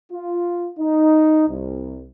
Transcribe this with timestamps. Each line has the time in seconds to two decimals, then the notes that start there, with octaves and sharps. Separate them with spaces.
0.12 F4
0.78 D#4
1.48 C2